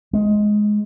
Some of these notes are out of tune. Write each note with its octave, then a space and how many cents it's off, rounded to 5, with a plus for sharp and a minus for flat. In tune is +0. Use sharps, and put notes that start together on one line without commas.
G#3 +10